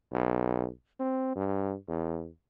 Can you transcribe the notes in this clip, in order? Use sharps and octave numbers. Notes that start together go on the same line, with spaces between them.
B1
C4
G2
E2